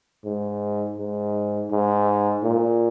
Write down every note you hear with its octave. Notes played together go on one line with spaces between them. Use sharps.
G#2
G#2
G#2
A#2